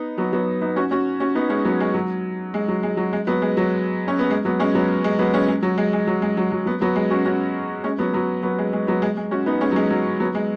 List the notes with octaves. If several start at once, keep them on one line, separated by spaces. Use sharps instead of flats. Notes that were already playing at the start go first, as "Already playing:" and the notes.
Already playing: B3 D#4
F#3 B3
F#3 B3
B3 D#4
C#4 F#4
C#4 F#4
C#4 F#4
B3 D#4
G#3 C#4
F#3 B3
G#3
F#3
G#3
F#3
G#3
F#3
G#3
F#3 B3
G#3
F#3
C#4
B3
G#3
F#3 B3
G#3 C#4
F#3 B3
G#3
F#3 B3
G#3 C#4
G#3
F#3
G#3
G#3
F#3
G#3
F#3
F#3
F#3 B3
F#3 B3
G#3
C#4 F#4
C#4 F#4
G#3 C#4
F#3 B3
F#3 B3
F#3 B3
G#3
G#3
F#3 B3
G#3
G#3
C#4 F#4
B3 D#4
G#3 C#4
F#3
G#3
F#3
F#3 B3
G#3